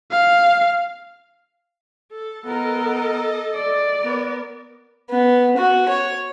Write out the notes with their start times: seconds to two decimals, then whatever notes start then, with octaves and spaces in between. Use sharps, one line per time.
0.11 F5
2.11 A4
2.44 B3 A4 A#4 D#5
3.55 D5
4.02 B3 A#4
5.10 B3
5.57 F#4
5.89 C#5